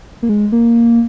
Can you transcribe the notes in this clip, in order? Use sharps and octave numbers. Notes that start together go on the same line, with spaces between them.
A#3
G#3
A#3